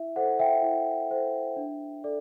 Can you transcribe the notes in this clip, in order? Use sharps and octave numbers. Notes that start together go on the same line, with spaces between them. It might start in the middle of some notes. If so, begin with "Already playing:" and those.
Already playing: E4 E5
A4 C5 F#5
E5 G5
E4
A4 C5
D4
A4 D5